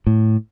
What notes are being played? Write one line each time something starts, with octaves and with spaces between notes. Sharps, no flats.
A2